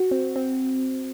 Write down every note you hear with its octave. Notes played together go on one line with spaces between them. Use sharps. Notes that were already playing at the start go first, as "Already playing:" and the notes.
Already playing: F#4
C4
C4